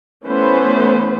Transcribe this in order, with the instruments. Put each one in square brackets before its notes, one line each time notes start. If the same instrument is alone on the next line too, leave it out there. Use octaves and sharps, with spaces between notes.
[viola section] E3 A3 B3 C#4 B4 C5